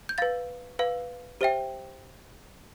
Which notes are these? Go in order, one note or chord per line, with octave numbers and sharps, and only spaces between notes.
G6
B4 F5 A6
B4 F5
G4 C5 E5 G5